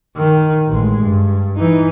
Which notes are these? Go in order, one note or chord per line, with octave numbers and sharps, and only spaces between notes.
D#3
A1 G#3
G2
E3 D#4